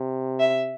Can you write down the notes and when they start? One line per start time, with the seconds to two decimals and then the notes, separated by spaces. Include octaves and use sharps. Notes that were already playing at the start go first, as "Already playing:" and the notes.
Already playing: C3
0.40 E5